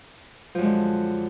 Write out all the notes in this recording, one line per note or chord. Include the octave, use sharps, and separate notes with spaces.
F#2 D3 F3 G#3